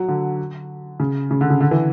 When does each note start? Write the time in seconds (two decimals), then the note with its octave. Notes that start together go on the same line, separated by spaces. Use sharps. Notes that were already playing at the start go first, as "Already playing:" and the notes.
Already playing: F#3
0.08 D3
1.00 C#3
1.31 C#3
1.41 D3
1.50 C#3
1.61 D3
1.71 E3